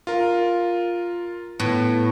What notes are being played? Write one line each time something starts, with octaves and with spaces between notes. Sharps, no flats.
F4 A#4
A2 B3